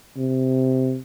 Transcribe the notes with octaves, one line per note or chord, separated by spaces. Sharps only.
C3